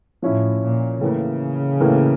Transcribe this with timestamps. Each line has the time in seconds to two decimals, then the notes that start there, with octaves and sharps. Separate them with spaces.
0.22 A2 F3 C#4 E4
0.62 A#2
1.01 A2 C#3 E3 A#3
1.80 A2 E3 A#3